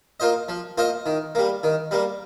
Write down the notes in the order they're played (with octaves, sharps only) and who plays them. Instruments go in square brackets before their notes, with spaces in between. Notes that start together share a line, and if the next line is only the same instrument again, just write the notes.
[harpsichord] A#3 F4 C5 D#5
F3
A#3 F4 C5 D#5
D#3
G3 A#3
D#3
G3 A#3